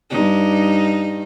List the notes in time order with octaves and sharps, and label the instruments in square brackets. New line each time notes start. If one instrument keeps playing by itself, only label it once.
[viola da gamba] G2 D#4